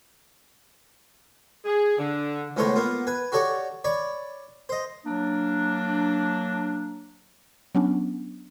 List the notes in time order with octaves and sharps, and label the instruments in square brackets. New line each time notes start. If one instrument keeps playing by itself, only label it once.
[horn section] G#4
D3
[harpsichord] C#2 A2 B3 A4 C5 C#5
A#3 B3 F4
B4 G#5
F#4 G4 A4 C#5 D5
C#5 D5 B5
C5 D#5
[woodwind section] F#3 A#3 D4
[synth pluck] F#3 B3 C#4 D4